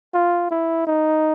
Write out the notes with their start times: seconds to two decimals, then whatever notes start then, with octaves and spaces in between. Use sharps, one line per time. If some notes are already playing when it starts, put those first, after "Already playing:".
0.14 F4
0.51 E4
0.87 D#4